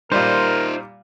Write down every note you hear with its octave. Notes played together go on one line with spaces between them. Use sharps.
A#2 G3 D#4 F4 A#4 C5